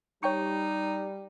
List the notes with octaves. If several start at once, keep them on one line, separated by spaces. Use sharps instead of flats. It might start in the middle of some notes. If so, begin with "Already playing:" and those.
G3 D#4 C#5 G5 C#6